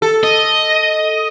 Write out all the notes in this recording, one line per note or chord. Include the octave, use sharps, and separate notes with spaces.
A4
D#5